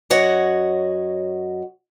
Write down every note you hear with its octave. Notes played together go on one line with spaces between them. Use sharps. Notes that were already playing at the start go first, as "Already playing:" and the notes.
F#2 F#4 C#5 D#5 F#5